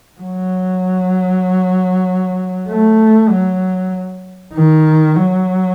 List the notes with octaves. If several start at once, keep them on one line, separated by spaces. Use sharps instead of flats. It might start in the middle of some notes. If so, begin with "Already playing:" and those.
F#3
A3
F#3
D#3
F#3